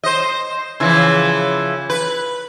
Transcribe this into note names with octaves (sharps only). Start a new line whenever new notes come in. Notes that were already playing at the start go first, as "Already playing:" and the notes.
C5 D#5
C#3 E3 F3
B4